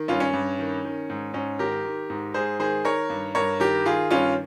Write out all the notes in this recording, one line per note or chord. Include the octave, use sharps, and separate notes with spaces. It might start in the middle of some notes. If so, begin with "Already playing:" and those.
Already playing: D#3
G2 C#4 F4
C#4
G2
D#3
D#3
G#2
G#2 C#4
D#3 G4 A#4
D#3
G#2
G#2 G#4 C5
D#3 G#4 C5
D#3 A#4 C#5
G2
G2 A#4 C#5
D#3 G4 A#4
D#3 F4 G#4
G2 C#4 F4